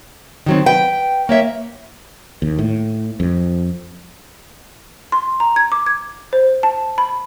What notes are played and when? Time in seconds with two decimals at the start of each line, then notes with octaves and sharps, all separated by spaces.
0.46 D#3 F#3 C4
0.66 B4 G5
1.29 A#3 C#5 E5
2.42 D#2
2.59 A2
3.20 F2
5.12 C6
5.40 A#5
5.56 G#6
5.72 D6
5.86 G#6
6.33 C5
6.63 A5
6.98 B5